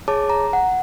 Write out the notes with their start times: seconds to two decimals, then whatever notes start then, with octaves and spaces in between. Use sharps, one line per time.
0.08 G#4 C#5 A5 D6
0.30 A#5
0.53 F#5